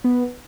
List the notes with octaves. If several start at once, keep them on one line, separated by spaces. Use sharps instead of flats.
B3